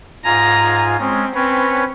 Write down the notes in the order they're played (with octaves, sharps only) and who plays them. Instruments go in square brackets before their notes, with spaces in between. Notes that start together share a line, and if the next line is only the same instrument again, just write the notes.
[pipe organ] G#2 F4 G#5 [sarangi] A#5
[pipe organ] G#3 C#4 [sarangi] C4
[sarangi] C4 [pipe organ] C#4 B4 C#5